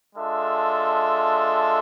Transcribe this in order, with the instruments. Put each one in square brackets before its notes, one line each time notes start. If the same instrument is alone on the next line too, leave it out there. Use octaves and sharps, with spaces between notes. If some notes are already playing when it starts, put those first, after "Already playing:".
[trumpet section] G#3 D4 F4 A4 E5